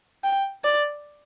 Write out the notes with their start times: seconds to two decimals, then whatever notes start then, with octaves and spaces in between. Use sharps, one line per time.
0.24 G5
0.64 D5